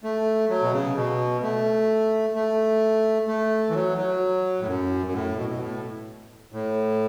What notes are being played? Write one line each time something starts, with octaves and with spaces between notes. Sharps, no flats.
A3
F#3
B2
C#3
B2
A3
A3
A3
E3
F#3
F#3
A2
F#2
F#2
A2
B2
B2
A2
A2